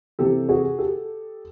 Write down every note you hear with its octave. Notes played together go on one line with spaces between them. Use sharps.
C3 E3 G4 A4
F#4 G#4
G4 A4